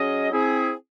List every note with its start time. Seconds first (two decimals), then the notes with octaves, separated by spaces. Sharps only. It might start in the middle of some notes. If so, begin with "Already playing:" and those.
Already playing: F#3 C#4 G#4 D#5
0.31 C4 E4 G#4